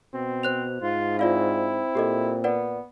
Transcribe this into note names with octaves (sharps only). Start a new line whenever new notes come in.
B2 C4
C5 F#6 F7
G#2 F4
C4 E4 F4 D5 F5
A#2 G4 A4 D#5
B3 B4 D5 F#5